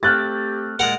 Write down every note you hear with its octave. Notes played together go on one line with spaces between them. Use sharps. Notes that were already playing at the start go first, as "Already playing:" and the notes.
A3 C4 G4 F6 F#6 A6
A#2 G#3 A#4 F#5